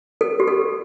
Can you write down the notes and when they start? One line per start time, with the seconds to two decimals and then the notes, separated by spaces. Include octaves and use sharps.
0.21 A4
0.40 G4
0.48 A4